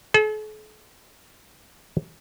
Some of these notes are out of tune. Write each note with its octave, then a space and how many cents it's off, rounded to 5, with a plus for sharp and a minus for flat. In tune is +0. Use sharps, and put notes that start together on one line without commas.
A4 -45